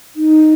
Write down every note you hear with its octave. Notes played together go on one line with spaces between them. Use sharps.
D#4